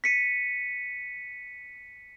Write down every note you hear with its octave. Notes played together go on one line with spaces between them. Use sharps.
B6 C#7 D#7